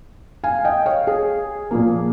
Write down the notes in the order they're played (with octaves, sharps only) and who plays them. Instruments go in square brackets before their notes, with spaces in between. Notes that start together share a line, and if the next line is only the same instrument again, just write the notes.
[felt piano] F5 G#5
D#5 G5
C#5 F5
G#4
A#2 F3 A#3